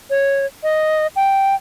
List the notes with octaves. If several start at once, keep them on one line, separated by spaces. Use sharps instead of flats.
C#5
D#5
G5